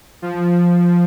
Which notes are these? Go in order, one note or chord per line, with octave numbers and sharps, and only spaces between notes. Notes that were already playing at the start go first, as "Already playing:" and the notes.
F3